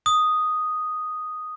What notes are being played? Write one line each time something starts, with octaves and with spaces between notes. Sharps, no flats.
D#6